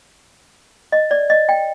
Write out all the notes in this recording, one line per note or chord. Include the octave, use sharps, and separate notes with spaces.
D#5
D5
D#5
G5